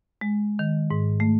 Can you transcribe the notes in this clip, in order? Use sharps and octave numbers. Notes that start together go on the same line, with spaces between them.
G#3
D#3
G#2
A3